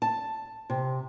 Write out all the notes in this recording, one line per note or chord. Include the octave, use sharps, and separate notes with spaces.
A5
C3